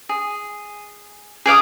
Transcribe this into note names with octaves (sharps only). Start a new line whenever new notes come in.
G#4
G#4 D5 F5 D#6